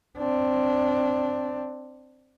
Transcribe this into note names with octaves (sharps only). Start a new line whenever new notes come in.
C4 D4